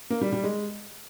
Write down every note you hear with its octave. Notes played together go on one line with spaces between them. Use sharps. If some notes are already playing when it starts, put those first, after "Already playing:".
A#3
G3
G3
G#3